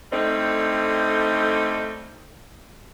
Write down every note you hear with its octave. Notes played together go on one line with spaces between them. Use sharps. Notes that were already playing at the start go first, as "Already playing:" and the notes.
D3 G3 A3 C4 D#4